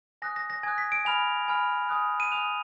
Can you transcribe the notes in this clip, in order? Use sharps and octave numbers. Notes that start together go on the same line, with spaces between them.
G#5 D#6 F#6 A#6
A#6
A#6
G#5 D#6 F#6 G#6
B6
D7
G#5 B5 F6 F7
G#5 B5 F6
G#5 D#6 F#6
D#7
G#5 D#6 F#6 F7